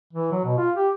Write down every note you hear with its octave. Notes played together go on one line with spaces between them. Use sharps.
E3
F#3
B2
F4
G4